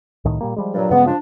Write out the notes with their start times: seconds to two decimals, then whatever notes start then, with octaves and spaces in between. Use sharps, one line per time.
0.25 C2 A2 D#3
0.41 A#2 G3 A#3
0.56 F3 G3 G#3
0.74 G2 A#2 F#3
0.90 G2 C#3 G#3 B3
1.05 F3 D4